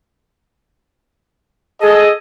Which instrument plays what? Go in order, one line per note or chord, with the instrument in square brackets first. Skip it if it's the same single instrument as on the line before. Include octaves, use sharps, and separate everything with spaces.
[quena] G#4 [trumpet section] A4 D#5